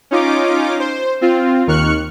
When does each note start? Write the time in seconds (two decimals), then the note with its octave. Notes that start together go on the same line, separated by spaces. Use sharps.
0.11 C#4 D#4 F4 D6
0.80 C5
1.21 C4 F4
1.67 D#2 D#3 C#6 F6 F#6 C#7